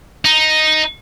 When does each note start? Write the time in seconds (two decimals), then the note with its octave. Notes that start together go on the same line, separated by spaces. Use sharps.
0.25 D#4